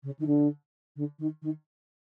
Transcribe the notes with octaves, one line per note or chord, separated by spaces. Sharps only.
C#3
D#3
D3
D3
D#3
D#3